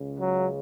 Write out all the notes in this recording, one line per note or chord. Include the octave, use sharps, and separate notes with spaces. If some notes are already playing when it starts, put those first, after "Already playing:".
Already playing: C#2 C#3
F#3